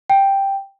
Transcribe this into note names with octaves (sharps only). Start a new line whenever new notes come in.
G5